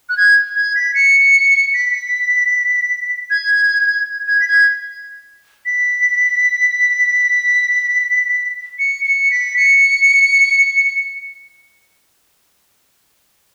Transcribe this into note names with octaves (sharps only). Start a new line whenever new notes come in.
F#6
G#6
G#6
B6
C#7
B6
G#6
G#6
B6
G#6
B6
C#7
C#7
B6
C#7